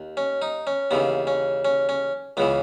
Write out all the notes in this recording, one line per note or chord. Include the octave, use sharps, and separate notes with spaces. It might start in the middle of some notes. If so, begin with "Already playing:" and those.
Already playing: D#2
C#4
D#4
C#4
D#2 C#3 E3 B3
C#4
C#4
C#4
C#2 C#3 E3 B3